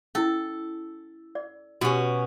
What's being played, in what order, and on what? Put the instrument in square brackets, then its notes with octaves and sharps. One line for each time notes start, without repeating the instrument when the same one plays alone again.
[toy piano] C#4 E4 [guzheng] A4
[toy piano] D5
[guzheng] B2 C#4 [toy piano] F#4 G4